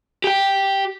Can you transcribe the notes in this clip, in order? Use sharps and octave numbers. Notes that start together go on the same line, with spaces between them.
G4 G5